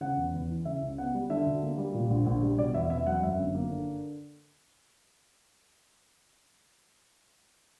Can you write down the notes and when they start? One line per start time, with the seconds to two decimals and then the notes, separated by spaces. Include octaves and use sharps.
0.01 C#3 F#5
0.17 E2
0.33 E2
0.50 E3
0.65 C#3 E5
0.82 C#2
0.98 B3 F#5
1.14 G3
1.30 D3 E5
1.46 D2
1.63 A#3
1.78 G3
1.94 A#2
2.10 A#1
2.26 A#1
2.42 G3
2.58 B2 D5
2.74 E2 E5
2.90 E2 E5
3.06 F#3 F#5
3.23 F#2 E5
3.39 G1
3.54 A#3
3.71 D3